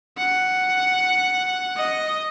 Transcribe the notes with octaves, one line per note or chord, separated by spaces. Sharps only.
F#5
D#5